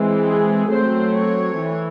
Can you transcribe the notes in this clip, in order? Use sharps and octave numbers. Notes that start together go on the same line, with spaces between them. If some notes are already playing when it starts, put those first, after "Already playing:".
Already playing: E3 G#3 C4
G#4
F#3 A3 C4 C5
C#5
E3